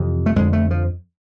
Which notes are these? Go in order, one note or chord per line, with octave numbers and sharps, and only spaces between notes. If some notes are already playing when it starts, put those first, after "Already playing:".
Already playing: F2 C3 E3
A3
F2 D3 G#3
A3
F3